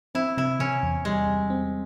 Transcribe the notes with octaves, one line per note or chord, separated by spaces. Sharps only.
C4 E4
C3 E4
C3 C#4
E2
G3 G#3
E2
C4